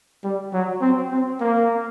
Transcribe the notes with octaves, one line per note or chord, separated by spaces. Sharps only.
G3
F#3
C4
C4
A#3